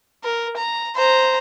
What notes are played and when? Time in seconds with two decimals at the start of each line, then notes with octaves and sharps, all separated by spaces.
0.24 A#4
0.57 A#5
0.96 C5 A#5